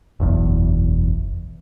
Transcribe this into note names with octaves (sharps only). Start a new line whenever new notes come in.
F#1 B1 E2